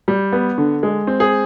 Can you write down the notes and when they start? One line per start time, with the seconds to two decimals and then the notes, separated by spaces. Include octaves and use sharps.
0.08 G3
0.32 B3
0.58 D3
0.83 G#3
1.07 C4
1.20 G#4